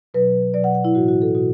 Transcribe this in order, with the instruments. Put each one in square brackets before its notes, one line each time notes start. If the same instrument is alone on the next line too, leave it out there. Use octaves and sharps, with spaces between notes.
[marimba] B2 F#3 B4
B2 F#3 D5
F#5
F#5
E4
A2 E3 F#4
F#4
A4
B2 F#4